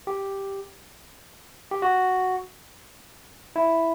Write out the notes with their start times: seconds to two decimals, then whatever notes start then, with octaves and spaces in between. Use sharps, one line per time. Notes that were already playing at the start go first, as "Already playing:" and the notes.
0.07 G4
1.71 G4
1.82 F#4
3.56 E4